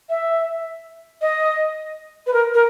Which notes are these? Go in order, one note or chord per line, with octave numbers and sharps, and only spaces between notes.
E5
D#5
B4
A#4
A#4